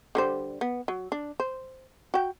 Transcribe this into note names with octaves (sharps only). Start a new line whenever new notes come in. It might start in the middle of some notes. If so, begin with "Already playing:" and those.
D3 G3 C5
B3
F#3
D4
C5
F#4 G5